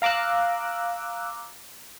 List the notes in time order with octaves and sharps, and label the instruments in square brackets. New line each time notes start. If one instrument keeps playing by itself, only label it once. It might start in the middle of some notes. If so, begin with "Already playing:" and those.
[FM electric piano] F5 A#5 D6 E6 F#6